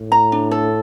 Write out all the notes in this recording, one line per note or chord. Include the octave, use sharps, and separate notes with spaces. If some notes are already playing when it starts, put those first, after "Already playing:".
Already playing: A2
A#5
D4
A4